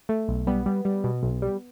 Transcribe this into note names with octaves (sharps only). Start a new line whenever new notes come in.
A3
B1
G3 B3
G3
G3
B2
B1
G3